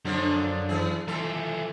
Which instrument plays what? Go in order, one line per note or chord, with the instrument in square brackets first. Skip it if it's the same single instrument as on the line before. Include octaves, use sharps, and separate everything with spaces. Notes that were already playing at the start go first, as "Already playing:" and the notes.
[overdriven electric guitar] F#2 [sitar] D3 F3 D4
[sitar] E3 G#4
[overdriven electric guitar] E3 F3 [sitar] A4